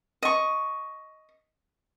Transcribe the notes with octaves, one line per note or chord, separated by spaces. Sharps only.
D#5 C#6